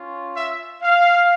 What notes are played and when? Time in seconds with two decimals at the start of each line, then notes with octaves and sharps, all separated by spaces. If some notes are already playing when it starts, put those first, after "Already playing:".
Already playing: C#4 F4
0.35 E5
0.82 F5